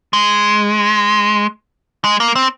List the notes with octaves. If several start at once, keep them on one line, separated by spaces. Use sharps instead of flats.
G#3
G#3
A#3
C4